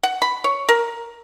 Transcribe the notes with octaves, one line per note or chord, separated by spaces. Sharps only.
F#5
B5
C#5
A#4